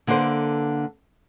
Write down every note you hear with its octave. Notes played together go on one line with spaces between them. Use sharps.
D3 A#3 A4 B4 C5